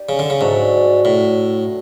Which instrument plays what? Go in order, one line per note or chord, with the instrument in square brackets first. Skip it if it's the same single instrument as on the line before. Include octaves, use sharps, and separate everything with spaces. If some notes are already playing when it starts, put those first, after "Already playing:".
Already playing: [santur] D#4 G4 D5
[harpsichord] C#3
D3
C#3
[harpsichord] G#2 [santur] F#3 A3 D4 F#4
[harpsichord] A2